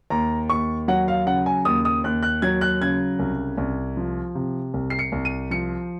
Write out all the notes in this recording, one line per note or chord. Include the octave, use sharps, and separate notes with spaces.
D#2 A#5
D#2 C#6
F#3 F#5
F5
C#3 F#5
G#5
D#2 D#6
D#6
D#2 F#6
F#6
F#3 G#6
F#6
C#3 G#6
C2
C2
F3
C3
C2
C7
C#7
C2
D#7
F3 C#7